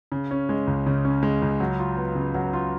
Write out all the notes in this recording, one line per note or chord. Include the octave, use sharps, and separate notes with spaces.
C#3
C#4
G#3
C#2
C#3
C#4
G#3
C#2
F#3
F4
B3
C#3
F#3
F4